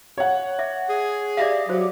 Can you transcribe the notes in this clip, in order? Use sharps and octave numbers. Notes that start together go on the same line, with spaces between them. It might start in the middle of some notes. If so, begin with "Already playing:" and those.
C#5 F#5
E5 D6
G#4
G4 D5 E5 F5
F#3 F#4 C5